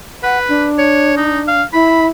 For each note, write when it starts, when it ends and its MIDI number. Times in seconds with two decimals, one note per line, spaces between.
0.23 0.67 71
0.23 0.39 78
0.49 1.61 62
0.78 1.14 73
1.17 1.40 63
1.48 1.63 77
1.73 2.07 64
1.73 2.06 83